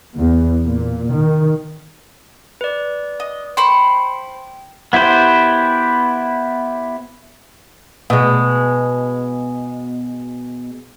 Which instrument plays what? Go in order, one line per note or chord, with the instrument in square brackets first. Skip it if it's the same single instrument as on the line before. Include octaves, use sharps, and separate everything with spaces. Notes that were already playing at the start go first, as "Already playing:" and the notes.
[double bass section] E2
A#2
D#3
[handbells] B4 D5
[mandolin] D#5
[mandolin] C5 B5 C#6 [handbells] G5
[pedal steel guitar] B3 E4 G4 C5
[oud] B2 G#3